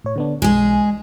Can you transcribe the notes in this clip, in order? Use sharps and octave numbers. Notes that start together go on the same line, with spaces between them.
A2 C#5
D3 B3 D4
B1 G#3 G#4